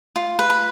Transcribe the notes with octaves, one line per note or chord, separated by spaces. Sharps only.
F4
B4
B5